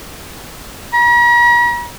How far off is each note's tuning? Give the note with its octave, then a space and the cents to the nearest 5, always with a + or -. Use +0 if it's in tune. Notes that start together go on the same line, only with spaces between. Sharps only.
A#5 +45